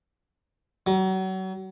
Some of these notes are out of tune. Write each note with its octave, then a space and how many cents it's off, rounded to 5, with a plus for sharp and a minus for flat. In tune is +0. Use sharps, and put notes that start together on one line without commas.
F#3 +35